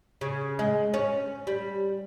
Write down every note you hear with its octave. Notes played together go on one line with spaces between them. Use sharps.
C#3
G#3
C#4
G3